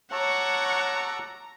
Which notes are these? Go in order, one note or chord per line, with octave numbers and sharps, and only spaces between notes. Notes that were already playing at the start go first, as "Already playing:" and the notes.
C#5 F#5 A5 A#5 C#6 D6 E6